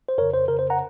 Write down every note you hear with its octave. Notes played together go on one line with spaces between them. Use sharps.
C5
F2 C#3 A#4 C#5
C5
F2 C#3 A#4
C5
F#5 A#5